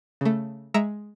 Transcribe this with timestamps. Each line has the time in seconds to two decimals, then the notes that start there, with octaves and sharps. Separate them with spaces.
0.21 C#3 A3
0.74 G#3 E5 A#5 E6 C#7 D7